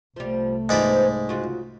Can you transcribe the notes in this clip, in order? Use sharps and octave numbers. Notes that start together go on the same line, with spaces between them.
C2 F3 G3 A3
G#2 E3 F3 B3 D5 B5
C#3 F4 F#4